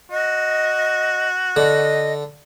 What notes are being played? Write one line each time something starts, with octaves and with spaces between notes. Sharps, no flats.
F#4 D#5
D3 D#5